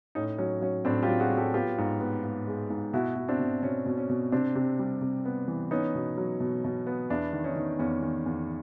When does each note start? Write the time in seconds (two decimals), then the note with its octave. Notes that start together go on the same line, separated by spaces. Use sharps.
0.15 A2 C#4 D#4
0.38 F#3 C#4
0.61 F#3 C#4
0.85 A2 C4 D4
1.03 F4 G4
1.08 F#3
1.20 F#4 G#4
1.31 F#3
1.37 G4 A4
1.54 B3 F4 G4
1.78 G#2
2.01 B3
2.24 G#2
2.47 G#3
2.70 G#2
2.93 B2 E4 F#4
3.16 B2
3.28 C4 D4
3.39 B2
3.63 B2 C#4
3.86 B2
3.98 C#4
4.09 B2
4.32 C3 C4 D4
4.55 C3
4.79 G3
5.01 C3
5.25 B3
5.48 E3
5.71 B3 C#4 D#4
5.95 B2
6.18 F#3
6.40 B2
6.64 B2
6.87 B3
7.10 E2 D4 E4
7.33 D#3
7.44 C#4 D#4
7.56 D#3
7.79 E2 C#4
8.03 D#3
8.26 E2